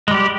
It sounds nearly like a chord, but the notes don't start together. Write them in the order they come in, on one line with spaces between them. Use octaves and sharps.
G#3 G3 G4